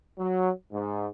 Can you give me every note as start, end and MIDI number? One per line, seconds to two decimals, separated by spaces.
0.19 0.51 54
0.72 1.07 44